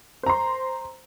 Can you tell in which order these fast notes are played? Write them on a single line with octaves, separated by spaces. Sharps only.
C5 A#5 C6